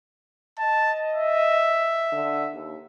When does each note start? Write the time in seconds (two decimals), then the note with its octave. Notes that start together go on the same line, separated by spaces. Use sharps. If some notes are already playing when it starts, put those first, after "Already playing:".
0.59 D#5 A5
1.14 E5
2.12 D3
2.53 D#2